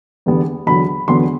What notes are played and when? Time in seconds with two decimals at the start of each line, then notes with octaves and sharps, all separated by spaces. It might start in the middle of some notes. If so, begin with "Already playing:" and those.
0.26 E2 D3 G3 B3
0.66 E2 D3 F#3 B3 B5
1.08 E2 D3 F#3 B3 C6